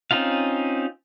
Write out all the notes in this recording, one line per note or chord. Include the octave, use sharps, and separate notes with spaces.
C4 C#4 D#4 F4 F5